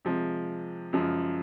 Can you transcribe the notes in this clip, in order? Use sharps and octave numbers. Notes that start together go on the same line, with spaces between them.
C3 F3 G#3
F#2 C#3 F3 G#3